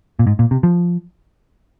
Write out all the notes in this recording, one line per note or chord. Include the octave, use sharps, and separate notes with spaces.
A#2
G#2
A#2
C3
F3